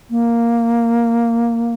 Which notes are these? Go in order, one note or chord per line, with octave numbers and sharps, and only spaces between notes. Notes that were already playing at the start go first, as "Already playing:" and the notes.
A#3